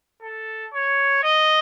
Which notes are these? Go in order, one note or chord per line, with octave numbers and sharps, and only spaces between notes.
A4
C#5
D#5